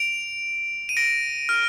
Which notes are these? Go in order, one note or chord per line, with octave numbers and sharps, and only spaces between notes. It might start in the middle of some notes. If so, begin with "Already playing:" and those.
Already playing: D7 F7
D#7
A#6 D7
F6